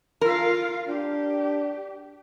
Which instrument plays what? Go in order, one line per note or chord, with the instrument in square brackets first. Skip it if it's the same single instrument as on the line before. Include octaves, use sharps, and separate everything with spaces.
[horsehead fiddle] F4 F5 [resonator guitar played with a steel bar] A#4
[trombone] D4 [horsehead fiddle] G4